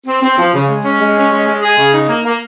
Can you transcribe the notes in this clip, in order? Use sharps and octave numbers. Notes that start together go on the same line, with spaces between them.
C4
C4
F3
C#3
G#3
C#4
G#3
C#4
G#3
G#3
G#4
C#3
D#4
A#3
A#3